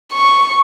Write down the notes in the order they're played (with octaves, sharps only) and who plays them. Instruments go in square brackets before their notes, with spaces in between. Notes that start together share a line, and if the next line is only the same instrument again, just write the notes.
[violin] C#6